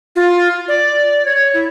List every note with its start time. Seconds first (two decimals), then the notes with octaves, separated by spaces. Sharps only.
0.16 F4
0.68 D5
1.26 C#5
1.54 E4